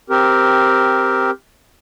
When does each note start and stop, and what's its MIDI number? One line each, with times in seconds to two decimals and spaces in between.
0.10 1.30 60
0.10 1.30 67
0.10 1.30 70